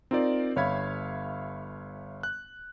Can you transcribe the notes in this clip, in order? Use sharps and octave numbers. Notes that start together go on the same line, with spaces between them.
C4 D#4 F4 A#4 D5
G1 C#5 E5 F5 B5 G#6
F#6